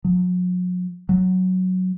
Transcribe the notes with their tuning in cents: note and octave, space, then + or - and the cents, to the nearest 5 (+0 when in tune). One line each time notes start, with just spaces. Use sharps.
F#3 -40
F#3 +0